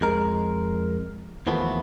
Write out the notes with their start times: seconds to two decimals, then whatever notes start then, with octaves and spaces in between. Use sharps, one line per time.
0.01 F2 G#3 A#4
1.47 D#2 E3 F3 A3 B3